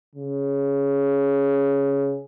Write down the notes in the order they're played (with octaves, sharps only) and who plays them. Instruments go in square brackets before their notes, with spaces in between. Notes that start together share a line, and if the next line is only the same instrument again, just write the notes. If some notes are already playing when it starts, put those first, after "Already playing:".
[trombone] C#3